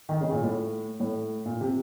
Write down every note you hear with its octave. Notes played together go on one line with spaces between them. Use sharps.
D#3
C#3
A#2
A2
A2
A#2
C3